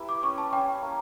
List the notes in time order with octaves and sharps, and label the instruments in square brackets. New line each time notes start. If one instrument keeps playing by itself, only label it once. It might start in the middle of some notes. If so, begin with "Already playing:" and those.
Already playing: [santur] E4 G4 B4
[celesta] D6
[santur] C#4 [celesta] C#6
[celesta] A5
[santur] C#4 [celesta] G5
[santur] A#3